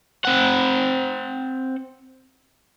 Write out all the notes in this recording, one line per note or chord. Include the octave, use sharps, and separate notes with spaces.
C4 F#5